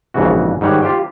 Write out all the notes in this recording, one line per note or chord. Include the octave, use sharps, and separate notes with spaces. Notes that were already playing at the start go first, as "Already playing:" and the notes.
A#1 F2 G#2 C#3 E3 F#4
G#2 D#3 G3 C#5 F#5
F4 G4 C5 G5